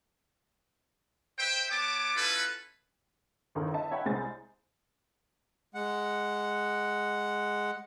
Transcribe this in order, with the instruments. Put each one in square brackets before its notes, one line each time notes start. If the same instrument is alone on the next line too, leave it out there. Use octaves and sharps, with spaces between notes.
[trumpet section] B4 C5 E5 G5
B3 C#5 A5 D6
C#4 E4 F4 A4 B4
[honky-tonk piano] G1 E2 D#3 A4 A#4
D#5 E5 A5
C#5 E5 F#5 G5 B5
C2 G#3 C5 G#5 A6
[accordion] G#3 F#5